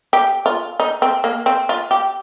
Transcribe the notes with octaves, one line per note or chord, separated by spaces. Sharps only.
G4
F4
D#4
C4
A#3
C4
F4
G4